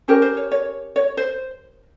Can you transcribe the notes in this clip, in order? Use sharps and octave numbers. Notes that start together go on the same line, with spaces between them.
C#4 G4 A#4 C5
C5
C#5
C#5
C#5
C5